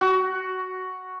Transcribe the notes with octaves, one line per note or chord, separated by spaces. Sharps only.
F#4